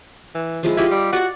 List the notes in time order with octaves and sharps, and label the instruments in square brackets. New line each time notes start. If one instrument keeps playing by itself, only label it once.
[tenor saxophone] E3
[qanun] F3 G#3 E4
[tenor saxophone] E4 [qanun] F4 G4 D#5
[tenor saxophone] G3
[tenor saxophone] F#4 [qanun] D5 F#5